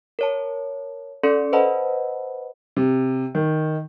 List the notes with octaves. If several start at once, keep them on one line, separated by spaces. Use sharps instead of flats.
A#4 C#5 A5
C#4 A4 D5 C6 C#7
B4 C5 D#5 F#5 A5 B5
C3
D#3